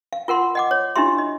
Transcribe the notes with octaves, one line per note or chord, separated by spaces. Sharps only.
F5
F4 A#4 F#5 C6
D#5 F#5 D6
C#5
D4 E4 F4 G4 E5 C6
D#5